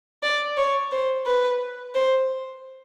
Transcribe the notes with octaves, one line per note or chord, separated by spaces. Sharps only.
D5
C#5
C5
B4
C5